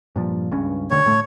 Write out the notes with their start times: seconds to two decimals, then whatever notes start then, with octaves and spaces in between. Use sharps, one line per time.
0.16 G2 A#2 F3
0.52 C#2 G2 C#4
0.91 E1 D2 D3 C#5
1.06 A2 A3